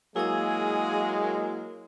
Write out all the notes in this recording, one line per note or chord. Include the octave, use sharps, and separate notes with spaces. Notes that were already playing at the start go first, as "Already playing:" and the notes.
F#3 G#3 A#3 E4 G#4 D#6